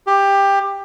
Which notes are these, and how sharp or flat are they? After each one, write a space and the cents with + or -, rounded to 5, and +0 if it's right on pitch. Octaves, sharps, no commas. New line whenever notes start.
G4 +15